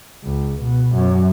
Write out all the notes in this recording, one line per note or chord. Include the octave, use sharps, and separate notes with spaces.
C#2
B2
F#2